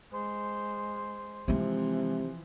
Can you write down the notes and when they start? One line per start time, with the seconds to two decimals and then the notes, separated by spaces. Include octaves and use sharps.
0.12 G#3 C5
1.48 C3 E3 F3 G#3 C4